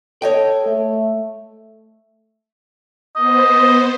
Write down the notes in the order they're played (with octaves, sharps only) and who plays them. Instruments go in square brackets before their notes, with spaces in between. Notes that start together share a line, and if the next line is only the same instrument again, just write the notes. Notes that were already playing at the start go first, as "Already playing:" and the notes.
[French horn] A4 [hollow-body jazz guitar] C#5 D#5 G5
[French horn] A3
[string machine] B3 C5 [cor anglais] D#5